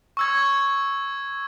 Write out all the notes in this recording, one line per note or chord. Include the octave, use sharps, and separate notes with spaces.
C#6 E6 G#6